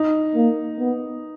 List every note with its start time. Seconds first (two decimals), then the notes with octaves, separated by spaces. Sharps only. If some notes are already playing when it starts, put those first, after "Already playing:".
Already playing: D#4
0.35 A#3
0.80 B3